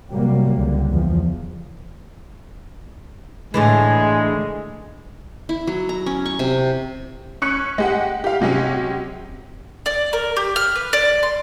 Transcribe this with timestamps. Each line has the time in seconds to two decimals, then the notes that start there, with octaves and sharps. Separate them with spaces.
0.10 C3 F#3 G3 A#3
0.56 C#2 D3 G3
0.90 E2 F3
3.54 A2 D3 E3 G#3
5.49 E4
5.67 F#3
5.89 A#5
6.06 C#4
6.26 C#6
6.39 C3
7.42 C#4 C#6 F#6 C#7
7.78 G#3 G4 F#5
8.24 G4 F5
8.41 C3 F#3 G#3 C#4 G4
9.86 D5
10.13 A#4
10.37 G4
10.56 F6
10.76 B4
10.93 D5
11.23 C6